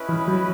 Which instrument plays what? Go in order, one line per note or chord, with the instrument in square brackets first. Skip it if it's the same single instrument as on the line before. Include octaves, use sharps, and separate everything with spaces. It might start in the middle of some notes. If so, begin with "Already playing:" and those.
Already playing: [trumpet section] C#4 E4 B4 D#5
[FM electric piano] E3
F#3